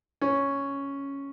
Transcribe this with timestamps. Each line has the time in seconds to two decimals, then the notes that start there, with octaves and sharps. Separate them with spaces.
0.21 C#4